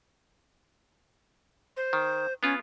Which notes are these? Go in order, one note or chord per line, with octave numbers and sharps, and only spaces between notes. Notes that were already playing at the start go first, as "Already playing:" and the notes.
C5
D#3
B3 C#4 F4